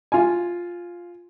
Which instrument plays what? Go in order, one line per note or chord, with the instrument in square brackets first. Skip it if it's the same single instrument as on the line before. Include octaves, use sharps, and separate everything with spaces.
[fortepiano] F4 G#5